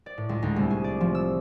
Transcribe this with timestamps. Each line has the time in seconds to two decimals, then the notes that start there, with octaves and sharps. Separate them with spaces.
0.06 D5
0.18 A2
0.29 C#2
0.42 D2
0.56 C2
0.70 G#4
0.84 D5
1.01 F3
1.15 E6